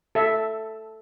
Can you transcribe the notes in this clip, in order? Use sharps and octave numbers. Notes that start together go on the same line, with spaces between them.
A4 E5